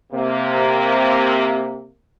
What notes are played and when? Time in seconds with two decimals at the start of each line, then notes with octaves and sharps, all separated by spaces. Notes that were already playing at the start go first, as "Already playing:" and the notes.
0.12 C3 A#3